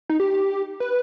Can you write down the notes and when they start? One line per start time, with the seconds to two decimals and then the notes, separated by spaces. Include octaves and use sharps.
0.09 D#4
0.20 G4
0.80 B4